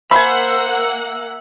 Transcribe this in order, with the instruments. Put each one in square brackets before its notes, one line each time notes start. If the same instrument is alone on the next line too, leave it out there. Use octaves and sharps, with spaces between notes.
[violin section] A#3 F#5 F#6 [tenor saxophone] C5 [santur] E5 G#5 [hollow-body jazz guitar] B5